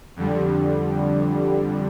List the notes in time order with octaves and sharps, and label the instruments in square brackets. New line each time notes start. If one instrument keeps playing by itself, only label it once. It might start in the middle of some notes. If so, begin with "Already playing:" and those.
[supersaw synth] F2 D3 G3